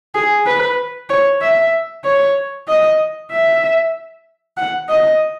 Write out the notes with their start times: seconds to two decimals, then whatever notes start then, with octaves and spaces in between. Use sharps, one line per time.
0.15 G#4
0.47 B4
1.10 C#5
1.42 E5
2.05 C#5
2.68 D#5
3.31 E5
4.58 F#5
4.89 D#5